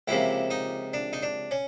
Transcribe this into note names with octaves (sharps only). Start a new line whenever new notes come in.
C#2 C3 F3 A#3 E4
D#4
D4
D#4
D4
C#4